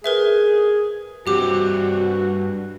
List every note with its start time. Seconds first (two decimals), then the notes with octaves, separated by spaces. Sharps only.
0.04 G#4 A#4 B4 E5
1.27 G2 C4 F#4 G4 D6